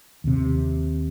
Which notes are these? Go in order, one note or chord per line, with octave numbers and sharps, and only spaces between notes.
D#2 C3